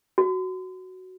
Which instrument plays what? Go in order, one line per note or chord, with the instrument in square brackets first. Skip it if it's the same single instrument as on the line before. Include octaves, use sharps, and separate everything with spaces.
[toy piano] F#4